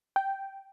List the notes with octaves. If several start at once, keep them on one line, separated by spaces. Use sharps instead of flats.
G5